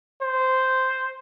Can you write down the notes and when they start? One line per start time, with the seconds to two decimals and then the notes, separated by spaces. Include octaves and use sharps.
0.22 C5